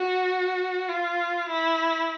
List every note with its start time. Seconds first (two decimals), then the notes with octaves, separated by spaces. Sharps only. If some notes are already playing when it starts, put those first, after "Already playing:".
Already playing: F#4
0.89 F4
1.50 E4